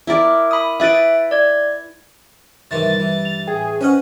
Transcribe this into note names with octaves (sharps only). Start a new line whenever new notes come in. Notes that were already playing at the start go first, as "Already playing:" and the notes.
E4 A#4 D5
B5 D#6
E4 B4 E5 A6 D7
D5 G#6
G2 C3 D#3 E3 A6
E3
F7
A2 G#4 G5
C#4 B4 C5 D#5 F#5 F6